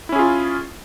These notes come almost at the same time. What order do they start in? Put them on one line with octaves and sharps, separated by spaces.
E4 C#4 G#4 F4